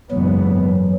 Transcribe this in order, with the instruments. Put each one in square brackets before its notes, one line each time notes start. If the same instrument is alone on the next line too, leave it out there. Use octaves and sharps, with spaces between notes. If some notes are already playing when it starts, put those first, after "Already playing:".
[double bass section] F#1 G#2 B3 [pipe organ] E3 F#3